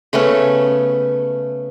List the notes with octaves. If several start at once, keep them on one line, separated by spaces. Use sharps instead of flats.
C#3 A3 B3 C#4